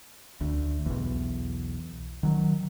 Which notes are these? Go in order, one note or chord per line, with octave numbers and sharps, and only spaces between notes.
D2
B1 E2
D#3 F#3